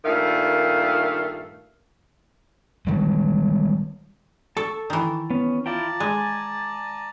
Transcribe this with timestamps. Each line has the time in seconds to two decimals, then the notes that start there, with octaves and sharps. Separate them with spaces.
0.04 G2 A#2 D#3 A3 F5
2.87 D#3 G3 G#3
4.57 A4 A5 C#6 E6
4.90 D#3 E3
5.30 B3 C#4
5.66 E4 F4 D5 G5 A5 A#5
6.00 G#3 G#5